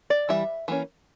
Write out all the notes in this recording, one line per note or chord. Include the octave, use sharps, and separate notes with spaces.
D5
E3 G3 E5
E3 A#3 C#4